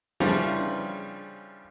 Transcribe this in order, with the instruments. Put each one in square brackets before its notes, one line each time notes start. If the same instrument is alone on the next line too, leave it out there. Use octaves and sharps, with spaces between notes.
[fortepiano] C#3 E3 F3 G3 D4 F4